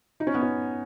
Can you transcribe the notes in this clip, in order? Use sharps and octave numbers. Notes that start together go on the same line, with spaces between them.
D#4
C#4
B3
C#4